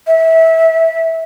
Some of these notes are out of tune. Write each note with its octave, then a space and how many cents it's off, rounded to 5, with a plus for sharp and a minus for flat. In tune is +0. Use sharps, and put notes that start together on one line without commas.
E5 -20